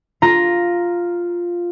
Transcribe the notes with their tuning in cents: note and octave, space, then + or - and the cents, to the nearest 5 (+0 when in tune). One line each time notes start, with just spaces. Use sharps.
F4 +0 A#5 +5